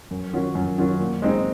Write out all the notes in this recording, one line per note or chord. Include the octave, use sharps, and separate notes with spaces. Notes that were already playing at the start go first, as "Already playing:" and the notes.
F#2
D#3 F#3 C#4 F4
F#2
D#3 F#3 C#4 F4
A#2
G#3 C4 D#4